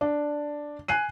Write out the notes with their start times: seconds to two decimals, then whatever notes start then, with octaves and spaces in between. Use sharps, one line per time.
0.01 D4
0.88 G#5 F#6 C7 D#7